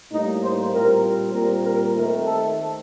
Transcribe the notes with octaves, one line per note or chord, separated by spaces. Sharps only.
A2 G3 A#3 D#4
C5
A#2 G3 C4 A#4
A#2 G3 C4 A#4
A#4
D#3 A3 C4 A#4
A4